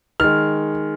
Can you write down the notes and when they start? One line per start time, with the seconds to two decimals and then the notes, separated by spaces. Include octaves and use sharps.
0.20 D#3 G#3 F6